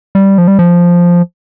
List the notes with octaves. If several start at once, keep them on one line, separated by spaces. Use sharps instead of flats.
G3
F3
G3
F3